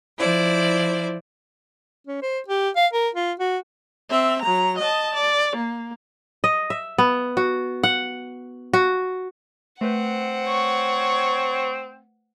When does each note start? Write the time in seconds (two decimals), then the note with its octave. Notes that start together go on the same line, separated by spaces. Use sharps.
0.18 F3 E4 C5 D5
2.07 C#4
2.22 C5
2.48 G4
2.76 F5
2.93 A#4
3.15 F4
3.39 F#4
4.10 C4 E5
4.42 F#3 A#5
4.79 D#5 A5
5.14 D5
5.56 A#3
6.44 D#5
6.70 E5
6.98 B3
7.37 F#4
7.83 F#5
8.73 F#4
9.81 A3 C4 B4 C5 F#5
10.47 C#5